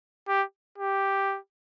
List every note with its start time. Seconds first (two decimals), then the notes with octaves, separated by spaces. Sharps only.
0.28 G4
0.78 G4